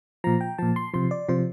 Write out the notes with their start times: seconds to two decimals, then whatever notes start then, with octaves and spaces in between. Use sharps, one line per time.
0.24 A#2 F3 A#5
0.41 G5
0.58 A#2 F3 A5
0.76 C6
0.94 C3 F3 C6
1.11 D5
1.29 C3 F3 C5